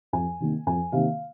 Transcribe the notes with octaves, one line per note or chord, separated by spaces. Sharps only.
F2 G#5
C3 D#3 A#3
F2 G#5
C3 D#3 A#3 F5